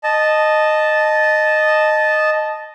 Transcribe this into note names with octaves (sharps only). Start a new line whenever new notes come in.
D#5 A5